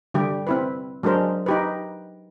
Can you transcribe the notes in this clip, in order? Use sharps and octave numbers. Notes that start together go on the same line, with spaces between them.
D3 G3 G4
C4 E4 B4
F#3 G#3 D4 A#4 C5
D#4 G4 B4